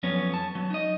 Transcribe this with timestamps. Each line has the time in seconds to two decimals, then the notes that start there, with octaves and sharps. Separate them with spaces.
0.03 F2 F#3 B3 C#4 C#5
0.34 A5
0.55 F#3
0.70 D#4 D#5